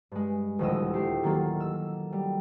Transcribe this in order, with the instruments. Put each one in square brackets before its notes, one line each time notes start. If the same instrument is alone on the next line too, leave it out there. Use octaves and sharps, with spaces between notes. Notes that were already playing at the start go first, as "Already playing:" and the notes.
[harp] G2 G#3
D#1 D2 F3 E4 D#5 E6
A3 G4 C7
D#3 F#3 A#3 A4
E6
G3